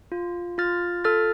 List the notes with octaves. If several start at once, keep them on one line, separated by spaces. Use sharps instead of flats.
F4
F4 F6 A6
A4 F6 A6